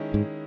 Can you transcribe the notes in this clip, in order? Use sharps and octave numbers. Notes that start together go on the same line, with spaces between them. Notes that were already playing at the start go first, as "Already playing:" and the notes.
Already playing: D#3 G#3 C#4 E4
G#2